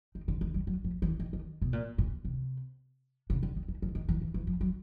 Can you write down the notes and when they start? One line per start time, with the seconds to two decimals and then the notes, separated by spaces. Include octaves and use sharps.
0.15 D#3
0.28 D3
0.41 D#3
0.54 G3
0.67 F#3
0.84 F3
1.02 E3
1.20 D#3
1.33 D#3
1.62 B2
1.73 A#2
1.98 A#2
2.25 C3
3.30 C#3
3.43 D3
3.57 D#3
3.68 E3
3.82 F3
3.95 D#3
4.09 E3
4.21 E3
4.34 E3
4.47 F3
4.61 F#3